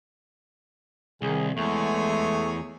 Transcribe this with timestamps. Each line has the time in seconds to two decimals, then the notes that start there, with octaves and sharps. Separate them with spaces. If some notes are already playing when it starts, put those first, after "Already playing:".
1.22 C2 D#3 G#4
1.57 E2 G#3 A3 G#4 C#5